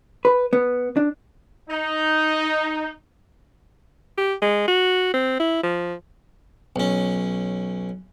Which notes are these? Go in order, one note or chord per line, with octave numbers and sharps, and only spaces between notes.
B4
B3
D4
D#4
G4
G#3
F#4
C4
E4
F3
B1 C#4